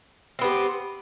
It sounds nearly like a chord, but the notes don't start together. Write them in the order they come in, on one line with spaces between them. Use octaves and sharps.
C4 B3 G4